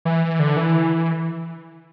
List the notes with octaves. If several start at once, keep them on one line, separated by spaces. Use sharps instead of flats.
E3
D3
E3